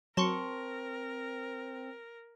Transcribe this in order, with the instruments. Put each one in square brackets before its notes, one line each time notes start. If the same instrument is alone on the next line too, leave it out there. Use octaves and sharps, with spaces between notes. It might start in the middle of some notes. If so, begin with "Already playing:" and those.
[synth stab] F#3 C#7 [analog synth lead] C4 [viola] A#4 [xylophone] A5 C6 C#6